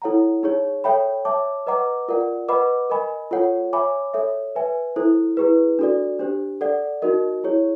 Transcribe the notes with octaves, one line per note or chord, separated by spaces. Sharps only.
E4 A4 C#5 F#5 A#5
D#4 G#4 C#5
A4 C#5 E5 G5 B5
C#5 E5 A5 D6
B4 D#5 F#5 A#5 D6
F4 A#4 D5 F#5
B4 D#5 F#5 B5 D6
A#4 D#5 G#5 B5
F4 A4 C#5 F#5
C#5 E5 G#5 B5 D6
A4 C#5 E5
B4 E5 G#5
E4 A4 C5
E4 G#4 B4
D4 F#4 A4 D5
D4 G4 C5
A4 D5 F#5
D#4 F#4 A#4 D#5
E4 G#4 C#5